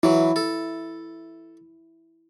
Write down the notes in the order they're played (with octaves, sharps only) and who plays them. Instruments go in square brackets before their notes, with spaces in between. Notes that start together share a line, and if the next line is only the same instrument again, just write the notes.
[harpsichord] E3 F#3 [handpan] E4
[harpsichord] A4